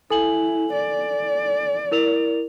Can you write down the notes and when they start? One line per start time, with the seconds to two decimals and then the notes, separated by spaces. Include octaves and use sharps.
0.10 E4 A4 G#5 F#7
0.73 D5
1.91 E4 A#4 F7